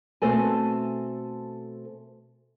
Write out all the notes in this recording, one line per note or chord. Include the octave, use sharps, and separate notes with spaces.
B2 A3 C4 A4 G#5